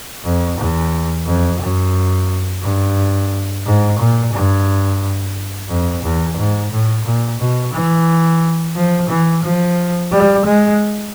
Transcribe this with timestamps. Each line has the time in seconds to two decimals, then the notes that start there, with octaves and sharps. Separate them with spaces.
0.24 F2
0.58 E2
1.26 F2
1.60 F#2
2.63 G2
3.65 G#2
3.99 A#2
4.33 G2
5.69 F2
6.03 E2
6.37 G#2
6.72 A2
7.05 A#2
7.40 B2
7.73 E3
8.76 F3
9.10 E3
9.43 F3
10.12 G3
10.46 G#3